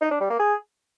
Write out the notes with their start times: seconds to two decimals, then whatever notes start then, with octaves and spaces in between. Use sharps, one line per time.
0.01 D#4
0.11 D4
0.20 G3
0.30 A#3
0.39 G#4